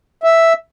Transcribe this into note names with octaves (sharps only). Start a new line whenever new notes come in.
E5